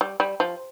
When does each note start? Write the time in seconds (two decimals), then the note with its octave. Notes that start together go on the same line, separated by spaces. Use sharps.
0.01 G3
0.20 G3
0.40 F3